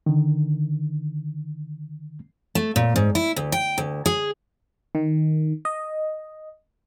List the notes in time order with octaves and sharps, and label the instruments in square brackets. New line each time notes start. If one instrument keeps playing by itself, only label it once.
[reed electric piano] D3 D#3
[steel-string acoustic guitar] A3
A#2
G#2
E4
D2
G5
D2
G#4
[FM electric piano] D#3
D#5